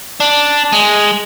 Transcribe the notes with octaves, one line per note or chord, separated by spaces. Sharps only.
D4
G#3